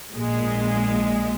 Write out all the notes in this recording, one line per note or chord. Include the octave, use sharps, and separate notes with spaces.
A#1 A#2 G#3